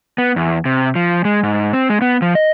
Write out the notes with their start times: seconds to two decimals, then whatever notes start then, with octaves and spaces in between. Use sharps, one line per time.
0.18 B3
0.36 E2
0.65 C3
0.95 F3
1.25 G#3
1.43 G#2
1.73 C4
1.90 G#3
2.02 B3
2.22 F3
2.35 D#5